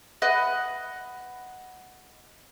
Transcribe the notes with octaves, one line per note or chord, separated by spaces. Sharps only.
B4 D#5 F#5